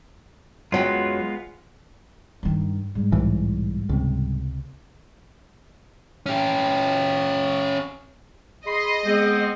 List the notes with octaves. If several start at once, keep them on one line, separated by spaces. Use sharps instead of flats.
F#2 F#3 G#3 B3 F4 G5
G2 D#3
G#2 G3
B1 A2 E3
C#2 C3
C#4 G4
G#4 D#5 B5 C6
G#3 B3 C4